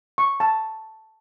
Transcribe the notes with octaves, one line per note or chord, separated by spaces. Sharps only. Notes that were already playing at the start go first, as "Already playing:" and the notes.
C#6
A5